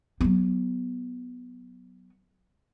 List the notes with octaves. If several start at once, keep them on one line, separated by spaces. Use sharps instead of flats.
F#3 B3